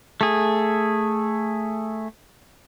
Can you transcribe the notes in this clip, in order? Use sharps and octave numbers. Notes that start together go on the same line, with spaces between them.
A3 G#4